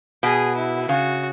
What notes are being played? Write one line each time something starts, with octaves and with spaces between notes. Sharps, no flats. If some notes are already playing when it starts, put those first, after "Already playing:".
B2 G#4
E4
C#3 F#4